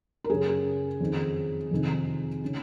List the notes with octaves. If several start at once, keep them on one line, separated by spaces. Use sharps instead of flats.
A#4
F#2 C#3 G#4
F2 D#3
F2 C3 D#3
C#3